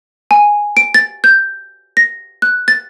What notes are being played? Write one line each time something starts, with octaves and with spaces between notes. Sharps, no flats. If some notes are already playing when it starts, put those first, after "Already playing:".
G#5
D7
A6
G6
A#6
F#6
A6